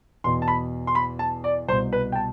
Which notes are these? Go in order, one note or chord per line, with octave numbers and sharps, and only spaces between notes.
E2 B2 C6
A5
B5
C6
B5
A5
D5
C2 B2 C5
B4
G5
A5